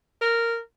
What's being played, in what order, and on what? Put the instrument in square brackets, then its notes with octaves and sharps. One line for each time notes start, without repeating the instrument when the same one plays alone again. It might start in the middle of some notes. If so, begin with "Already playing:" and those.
[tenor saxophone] A#4